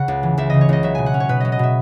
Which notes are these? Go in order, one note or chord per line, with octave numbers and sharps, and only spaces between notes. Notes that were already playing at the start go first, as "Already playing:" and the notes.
Already playing: C#3 F#5
C#2
E3
C#2 E5
C#3 D#5
C#5
C#2 D#5
F#3 E5
B2 G#5
F#5
C#4
C#5
B2 B4
F#3 D#5
D#5
B2 E5